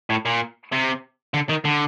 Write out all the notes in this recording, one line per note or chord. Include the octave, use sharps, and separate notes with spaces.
A2
A#2
C3
D3
D#3
D3